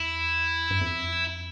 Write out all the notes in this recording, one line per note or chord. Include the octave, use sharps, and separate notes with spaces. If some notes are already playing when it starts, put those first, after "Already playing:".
Already playing: E2 E4
G2
F2